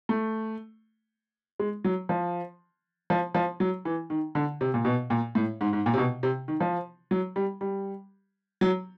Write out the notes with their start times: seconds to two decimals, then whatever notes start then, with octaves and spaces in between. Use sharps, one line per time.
0.09 A3
1.59 G#3
1.84 F#3
2.09 F3
3.10 F3
3.35 F3
3.60 F#3
3.85 E3
4.10 D#3
4.35 D3
4.61 C3
4.74 A#2
4.85 B2
5.10 A#2
5.35 A2
5.61 G#2
5.73 G#2
5.86 A#2
5.94 C3
5.98 B2
6.23 C3
6.48 D#3
6.60 F3
7.11 F#3
7.36 G3
7.61 G3
8.61 F#3